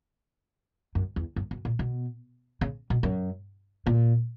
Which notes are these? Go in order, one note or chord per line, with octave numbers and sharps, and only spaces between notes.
F#2
E2
F#2
F#2
A#2
B2
C#3
B2
F#2
A#2